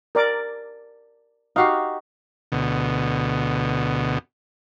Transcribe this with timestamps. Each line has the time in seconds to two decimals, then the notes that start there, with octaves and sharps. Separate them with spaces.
0.15 A#4 D5 D6
1.56 D#4 F#4 G4 F5
2.52 D2 B2